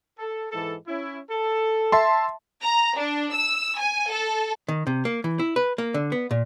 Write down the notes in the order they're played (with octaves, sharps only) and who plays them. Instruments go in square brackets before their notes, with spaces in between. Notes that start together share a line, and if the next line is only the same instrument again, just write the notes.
[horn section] A4
G#2 E3 A4
C#4 E4
A4
[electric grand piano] E5 A5 C6
[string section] A#5
D4
E6
G#5
A4
[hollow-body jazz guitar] D#3
C3
A#3
E3
E4
B4
A#3
D3
B3
A#2